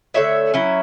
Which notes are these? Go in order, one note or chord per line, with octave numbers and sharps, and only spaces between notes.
D3 A3 E4 C#5 E5
F#3 C#4 E4